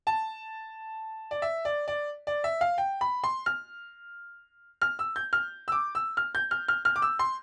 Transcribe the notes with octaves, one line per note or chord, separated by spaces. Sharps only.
A5
D5
E5
D5
D5
D5
E5
F5
G5
B5
C6
F6
F6
E6
G6
F6
E6
D6
E6
F6
G6
F6
F6
F6
D6
E6
C6